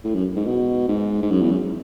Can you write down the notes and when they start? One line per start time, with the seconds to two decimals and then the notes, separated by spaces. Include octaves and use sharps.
0.04 A2
0.15 F#2
0.36 G#2
0.46 B2
0.88 G#2
1.22 G#2
1.31 F#2
1.41 E2
1.51 F#2